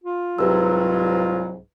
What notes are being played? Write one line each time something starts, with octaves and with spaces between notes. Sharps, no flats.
F4
C2 G#2 F#3 G4 B4 E6